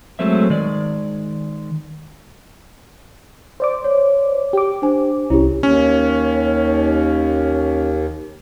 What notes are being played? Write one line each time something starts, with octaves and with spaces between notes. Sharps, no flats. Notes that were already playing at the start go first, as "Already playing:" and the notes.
F#3 G#3 A3 C4 E5
D#3 G#3 D5
C5 D5 D6
C#5
G4 D6
D4 C5 G#5
C2 C#4 E4 G4
D#2 C#4